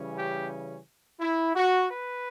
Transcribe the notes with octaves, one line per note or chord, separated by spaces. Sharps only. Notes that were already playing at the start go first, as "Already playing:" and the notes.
Already playing: C#3 E3 G3 C#4
G4
E4
F#4
B4